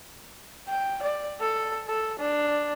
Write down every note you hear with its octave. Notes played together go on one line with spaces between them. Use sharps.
G5
D5
A4
A4
D4